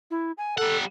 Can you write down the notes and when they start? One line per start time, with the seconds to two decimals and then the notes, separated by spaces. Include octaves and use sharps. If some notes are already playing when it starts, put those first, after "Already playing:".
0.11 E4
0.38 G#5
0.58 G3 A4 F#5